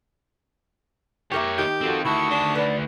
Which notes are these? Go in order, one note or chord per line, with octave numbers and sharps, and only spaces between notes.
A#3 G4 A#4 C#5 E5
D#3 G4
C4 F4 F#4 A4
D2 E4 F#4 A5 C#6 D#6
D4
B4 D5